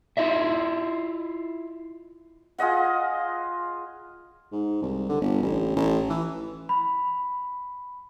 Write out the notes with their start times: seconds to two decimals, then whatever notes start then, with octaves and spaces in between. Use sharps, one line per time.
0.17 E4 F4 D#5 E5
2.58 F4 G#4 D#5 F#5
4.52 G#2
4.82 C2
5.09 D3
5.21 G1
5.42 A1
5.76 A1
6.10 E3
6.69 B5